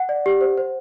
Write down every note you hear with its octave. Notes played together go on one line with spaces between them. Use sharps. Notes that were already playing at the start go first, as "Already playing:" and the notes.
Already playing: F#5
D5
G4
C5
C5